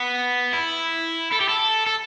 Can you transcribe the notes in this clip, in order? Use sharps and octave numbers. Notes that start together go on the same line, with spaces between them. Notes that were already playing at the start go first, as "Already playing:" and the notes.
Already playing: B3
E4
A4
G4
A4
A4